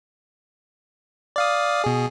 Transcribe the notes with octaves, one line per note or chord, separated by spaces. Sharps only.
D5 F5 D#6
B2 G#4